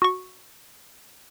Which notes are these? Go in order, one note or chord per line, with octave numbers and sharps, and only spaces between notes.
F#4 C#6